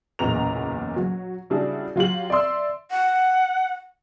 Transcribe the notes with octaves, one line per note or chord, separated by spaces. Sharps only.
F#1 B1 E2 A#2 A#5 F7
F#3
C#3 G3 D4 E4 F#4 G#4
F#3 F4 G4 F#7
D5 E5 C6 E6
F#5